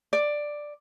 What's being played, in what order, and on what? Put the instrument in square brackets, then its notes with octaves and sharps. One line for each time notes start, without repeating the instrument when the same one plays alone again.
[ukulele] D5